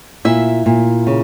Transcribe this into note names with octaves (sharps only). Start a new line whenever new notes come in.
A#2 E4 E5
A#2
C#3